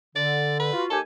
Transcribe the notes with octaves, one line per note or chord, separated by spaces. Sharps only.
D3 D5
B4
F4 F#4
D#2 G4 A4 G#5